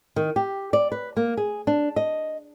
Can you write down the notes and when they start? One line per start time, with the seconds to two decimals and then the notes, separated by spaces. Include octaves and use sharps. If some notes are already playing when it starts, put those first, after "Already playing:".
0.16 D#3
0.36 G4
0.73 D5
0.92 B4
1.17 A#3
1.37 G#4
1.67 D4
1.96 D#5